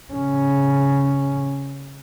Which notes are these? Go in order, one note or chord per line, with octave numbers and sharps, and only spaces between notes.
C#3 C#4